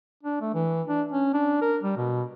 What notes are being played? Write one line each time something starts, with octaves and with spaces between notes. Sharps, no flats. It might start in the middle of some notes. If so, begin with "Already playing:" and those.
D4
A3
E3
D4
C#4
D4
A#4
G3
B2